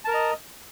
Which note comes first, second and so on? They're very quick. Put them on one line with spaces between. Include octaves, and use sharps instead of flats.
A5 A#4 A#5 D#5